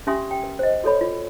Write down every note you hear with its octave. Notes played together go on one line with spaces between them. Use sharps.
C#4 G4 E5 G#5 C6 D#6
G5
A#4
C5 D#5
F#4 A4 C#5 B5
F4